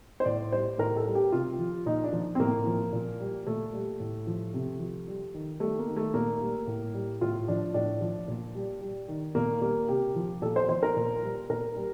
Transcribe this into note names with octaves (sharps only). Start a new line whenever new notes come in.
C5
A2 D5
G3 C5
A2 A#4
A4
G3
G4
C3 F4
F3
A#2 D#4
D4
F3
C4
A2 A#3
F3
A#2
G3
A#2 A3
G3
A2
F3
C3
F3
G3
D#3
G3 A3
A#3
D#3
A3
A#2 A#3
G3
A2
G3
A2 F4
F3 D4
A2 D4
F3
A#2
G3
G3
D#3
A#2 A#3
G3 A#3
C3 G4
F3
A#2 A4
C5
F3 C5
A#4
A#2
G3
A#2 A#4
G3